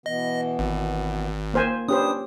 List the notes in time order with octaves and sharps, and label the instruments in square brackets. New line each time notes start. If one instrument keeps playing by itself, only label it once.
[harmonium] B2 E3 B3 [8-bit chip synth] D#5
[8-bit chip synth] G#1
[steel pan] A#3 C5 G#5
[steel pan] C#4 G4 C5 [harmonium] D4 B4 [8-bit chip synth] D#6